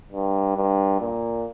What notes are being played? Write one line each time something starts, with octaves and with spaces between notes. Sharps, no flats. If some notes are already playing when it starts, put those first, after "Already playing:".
G2
G2
A#2